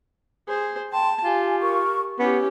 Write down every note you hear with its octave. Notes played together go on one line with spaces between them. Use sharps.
G#4 C5
G5 A5 C6
F4 G4 G#5
A#4 C#6
B3 C#4 E4 G4